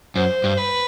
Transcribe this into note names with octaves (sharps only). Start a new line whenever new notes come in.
F#2 C5
G2
B4